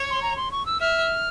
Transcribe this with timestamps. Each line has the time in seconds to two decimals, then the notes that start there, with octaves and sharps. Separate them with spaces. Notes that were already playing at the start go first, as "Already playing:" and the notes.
Already playing: C#5
0.10 C6
0.22 A#5
0.37 C6
0.52 C#6
0.66 E6
0.81 E5 F6